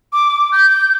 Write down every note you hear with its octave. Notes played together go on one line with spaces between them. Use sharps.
D6
G6